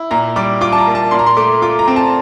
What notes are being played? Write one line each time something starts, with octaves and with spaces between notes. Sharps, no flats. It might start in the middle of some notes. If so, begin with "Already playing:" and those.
Already playing: E4
A#2 A#5
G3 D6
F4 D6
A5
A#5
A#3
A5
A#2 C6
A#5
C6
A3 D6
F4 D6
A#5
C4
A5